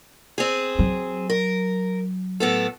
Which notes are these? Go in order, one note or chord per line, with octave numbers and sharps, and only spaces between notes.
C4 G#4
F#3
A#4
A2 B3 A4